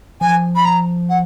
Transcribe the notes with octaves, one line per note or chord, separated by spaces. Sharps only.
F3 G#5
B5
A#5
F#5